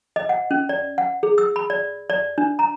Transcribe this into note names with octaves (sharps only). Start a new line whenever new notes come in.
D#5
F#5
C#4
D5
F#5
G#4
E6
B5
D5
D5
D4
A#5